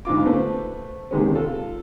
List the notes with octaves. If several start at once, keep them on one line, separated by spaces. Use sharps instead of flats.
D2 G#2 F4 D6
A3 B4 C5
C3 D#3 G#3 B3 C#4
F4 A4